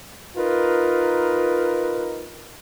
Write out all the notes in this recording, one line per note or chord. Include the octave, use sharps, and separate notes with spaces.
D#4 F4 A#4 B4